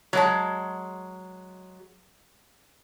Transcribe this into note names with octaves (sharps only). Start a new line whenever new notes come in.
F#3 G#3 A5